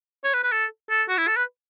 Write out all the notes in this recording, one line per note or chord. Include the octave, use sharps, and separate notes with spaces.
C#5
B4
B4
A4
A4
F#4
E4
A4
B4